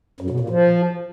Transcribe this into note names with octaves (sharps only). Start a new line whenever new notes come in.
F#2
B2
A#2
F3